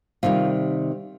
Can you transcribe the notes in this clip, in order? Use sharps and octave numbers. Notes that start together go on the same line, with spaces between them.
C3 D#3 G3 F4